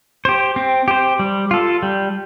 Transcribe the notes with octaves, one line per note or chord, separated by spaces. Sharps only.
G4 C5
C4
G4 C5
G3
F4 A4
G3